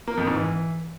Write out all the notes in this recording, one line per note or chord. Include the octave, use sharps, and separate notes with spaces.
A#3
F2
G#2
E3